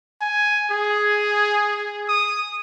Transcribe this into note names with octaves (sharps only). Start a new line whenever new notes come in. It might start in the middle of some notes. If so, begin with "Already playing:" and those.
G#5
G#4
D#6